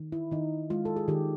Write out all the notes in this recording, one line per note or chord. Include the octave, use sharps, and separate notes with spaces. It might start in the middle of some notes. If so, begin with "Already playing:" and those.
Already playing: D#3
E4
D#3 D#4
G#3 F4
A4
G#4
D#3 G4